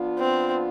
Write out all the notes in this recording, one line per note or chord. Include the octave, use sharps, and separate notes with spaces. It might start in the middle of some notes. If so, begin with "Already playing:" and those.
Already playing: F3 B3 D4 F4
C4